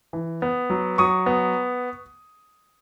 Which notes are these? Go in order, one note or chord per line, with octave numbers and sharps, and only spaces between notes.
E3
B3
F#3
F#3 C#6 D#6
B3